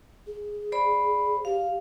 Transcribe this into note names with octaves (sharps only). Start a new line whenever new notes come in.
G#4
C5 D5 B5
G4 F5